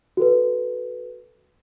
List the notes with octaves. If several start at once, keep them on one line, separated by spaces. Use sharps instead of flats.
F#4 A4 B4